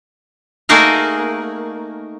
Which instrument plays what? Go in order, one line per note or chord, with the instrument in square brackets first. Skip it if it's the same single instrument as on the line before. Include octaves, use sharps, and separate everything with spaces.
[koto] A3 A#3 D#4 F#4 G#4 A#4